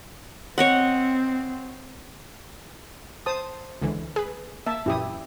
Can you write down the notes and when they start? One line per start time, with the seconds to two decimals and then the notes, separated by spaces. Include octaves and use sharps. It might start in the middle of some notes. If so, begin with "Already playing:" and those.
0.58 C4 C#5 D#5 F#5
3.26 C5 A5 D#6
3.82 C#2 D3 E3
4.16 G#4 B4
4.66 A#3 E5 A5
4.86 F#2 A#2 E3 E4 G4 D#6